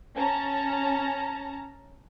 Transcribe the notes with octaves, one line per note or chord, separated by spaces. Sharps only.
C#4 A5 A#5